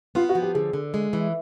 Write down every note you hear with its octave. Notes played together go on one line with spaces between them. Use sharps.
B3 F4
F#4
F3
G4
D3 G#4
D3
G#3
E3